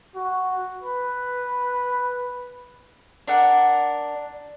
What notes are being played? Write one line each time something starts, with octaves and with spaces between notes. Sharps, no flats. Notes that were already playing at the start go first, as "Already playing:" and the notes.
F#4
B4
D4 A#4 F#5